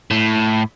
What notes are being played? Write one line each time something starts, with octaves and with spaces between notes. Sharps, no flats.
A2